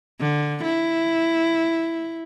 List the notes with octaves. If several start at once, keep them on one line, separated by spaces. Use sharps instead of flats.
D3
E4